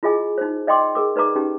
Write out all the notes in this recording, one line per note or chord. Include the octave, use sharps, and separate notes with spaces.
E4 F4 G#4 D#5 G#5 D6
D#4 C5
D5 D#5 G5 C6 D6
G#4 A#4 D6
D#4 B4 D5 A#5 D6
C#4 D#4 G4